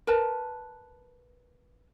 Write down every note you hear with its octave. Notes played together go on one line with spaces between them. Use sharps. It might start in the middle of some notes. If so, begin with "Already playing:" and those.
A#4 B4 A5